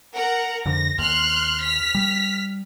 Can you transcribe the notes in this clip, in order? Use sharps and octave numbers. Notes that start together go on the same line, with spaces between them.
A#4 F#5 A#5
F2 D3 A#6
D#2 C6 F6 F#6
F6 B6
G3